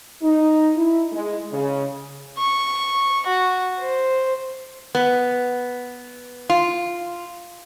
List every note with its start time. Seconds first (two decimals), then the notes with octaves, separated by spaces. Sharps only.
0.22 D#4
0.75 E4
1.12 G#3
1.51 C#3
2.38 C#6
3.26 F#4
3.79 C5
4.95 B3
6.50 F4